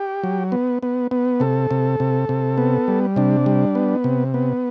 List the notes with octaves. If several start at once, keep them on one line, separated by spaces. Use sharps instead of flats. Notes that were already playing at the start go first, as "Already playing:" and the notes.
Already playing: G4
F#3
B3
B3
B3
C3 A4
C3
C3
C3
B3
G3
C3 D4
G3
B3
C3
B3